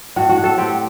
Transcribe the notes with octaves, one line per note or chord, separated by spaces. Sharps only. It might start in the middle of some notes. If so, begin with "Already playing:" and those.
A2 F#4
F#4
A2
A4
C4 G4